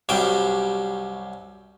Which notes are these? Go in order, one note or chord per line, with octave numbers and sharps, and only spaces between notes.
C2 F#2 G3 G5